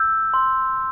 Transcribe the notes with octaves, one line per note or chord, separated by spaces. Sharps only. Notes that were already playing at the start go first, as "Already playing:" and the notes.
Already playing: E6 G6
C6